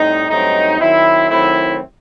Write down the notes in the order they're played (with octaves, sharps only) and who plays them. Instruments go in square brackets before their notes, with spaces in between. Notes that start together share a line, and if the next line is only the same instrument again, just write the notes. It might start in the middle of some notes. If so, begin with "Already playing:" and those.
Already playing: [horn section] A2 G3 C4 D#4
G2 F#3 A3 C4 D#4
D#3 F#3 C4 E4
D#3 F#3 A3 C4 E4